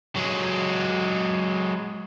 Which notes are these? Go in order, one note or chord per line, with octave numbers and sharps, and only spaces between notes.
F#3 G#3